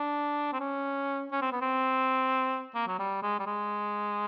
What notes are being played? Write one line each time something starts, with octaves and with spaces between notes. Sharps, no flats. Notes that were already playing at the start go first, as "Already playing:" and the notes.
Already playing: D4
C4
C#4
C#4
C4
B3
C4
A#3
F#3
G3
G#3
G3
G#3